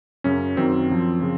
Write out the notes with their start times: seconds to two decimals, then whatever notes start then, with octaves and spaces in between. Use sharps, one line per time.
0.24 F#2 C#3 F#3 C#4
0.57 F#2 D#3 F#3 C4
0.89 F#2 F3
1.21 C#3 F3